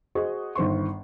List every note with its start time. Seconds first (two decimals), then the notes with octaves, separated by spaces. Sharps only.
0.15 F#4 G#4 C5 D#5 C#6
0.55 G1 D#3 C5 C6 C#6